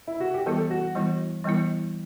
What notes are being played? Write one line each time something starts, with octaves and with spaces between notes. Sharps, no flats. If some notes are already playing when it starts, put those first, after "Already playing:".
E4
F#4
G4
E3 G3 B3 E4 A4
F#4
E3 G3 B3 E4
E3 G3 B3 E4